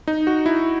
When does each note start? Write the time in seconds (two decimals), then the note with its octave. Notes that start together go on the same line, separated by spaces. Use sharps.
0.08 D#4
0.27 F#4
0.46 E4